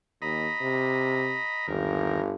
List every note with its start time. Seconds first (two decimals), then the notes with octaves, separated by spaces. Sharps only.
0.22 D#2 D#5 A#5 B5
0.61 C3
1.68 G1 D#2 A#4